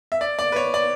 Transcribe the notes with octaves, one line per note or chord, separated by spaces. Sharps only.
E5
D5
D5
B4
C#5
D5